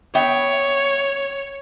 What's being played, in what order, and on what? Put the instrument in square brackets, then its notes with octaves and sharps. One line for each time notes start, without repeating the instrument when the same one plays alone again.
[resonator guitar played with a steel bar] B3 E5 G5 [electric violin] C#5